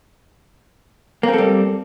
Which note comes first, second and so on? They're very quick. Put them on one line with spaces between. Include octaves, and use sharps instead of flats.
A#3 C4 A4 G3